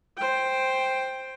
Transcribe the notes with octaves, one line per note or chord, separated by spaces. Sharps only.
C5 G5